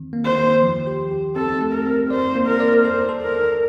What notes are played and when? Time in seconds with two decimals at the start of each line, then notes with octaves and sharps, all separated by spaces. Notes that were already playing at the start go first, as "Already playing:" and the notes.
Already playing: D#3 C4
0.13 A#3
0.25 C5
0.38 D#3
0.62 F3
0.87 G4
1.11 G4
1.36 C4 A4
1.61 A3
1.73 A#4
1.86 C4
2.10 C5 D5
2.35 A#3
2.48 A#4
2.60 D5
2.85 A4 C5
3.09 A4
3.22 A#4
3.35 A4